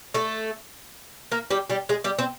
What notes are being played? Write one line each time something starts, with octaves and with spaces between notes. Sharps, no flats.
A3 A4
A#3 A#4
G3 G4
G3 G4
G#3 G#4
G3 G4
C4 C5